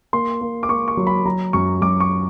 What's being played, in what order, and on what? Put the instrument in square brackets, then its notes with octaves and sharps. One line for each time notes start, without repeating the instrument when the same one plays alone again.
[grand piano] A#3 C6
A#3
D6
A#3 C#6
C#6
F#3
B5
F#3 A#5
F#2 C#6
F#2 D6
C#6